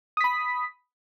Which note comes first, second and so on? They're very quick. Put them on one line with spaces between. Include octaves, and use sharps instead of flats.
D#6 B6 B5